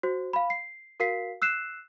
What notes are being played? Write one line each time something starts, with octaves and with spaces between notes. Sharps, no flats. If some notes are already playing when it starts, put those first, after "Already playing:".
F#4 C5
F5 B5
C7
F#4 A#4 F5 B6 C7
E6 F#6 C7 E7